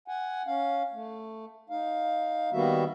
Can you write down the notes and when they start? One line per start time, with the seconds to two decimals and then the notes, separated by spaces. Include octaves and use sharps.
0.08 F#5 G#5
0.47 C#4 F5
0.93 A3
1.70 D#4 F5
2.53 D#3 G3 A#3 B3 F#4 E5